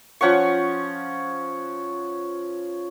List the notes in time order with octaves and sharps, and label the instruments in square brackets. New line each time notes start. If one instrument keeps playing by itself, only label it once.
[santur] F3 C#4 F#5 C#6